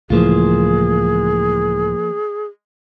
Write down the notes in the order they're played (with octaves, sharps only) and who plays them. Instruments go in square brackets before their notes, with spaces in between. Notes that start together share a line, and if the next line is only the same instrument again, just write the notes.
[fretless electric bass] C#2 A2 E3 [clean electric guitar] F3 A#3 F4 [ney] G#4